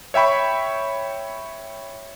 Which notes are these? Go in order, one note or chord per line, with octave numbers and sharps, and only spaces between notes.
C#5 E5 G5 B5 C#6